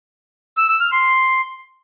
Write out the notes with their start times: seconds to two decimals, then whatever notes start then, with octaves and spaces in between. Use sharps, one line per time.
0.57 E6
0.69 E6
0.80 F6
0.92 C6